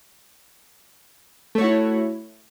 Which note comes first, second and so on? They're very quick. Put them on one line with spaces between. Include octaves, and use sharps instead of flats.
A3 C#5 F#4 E4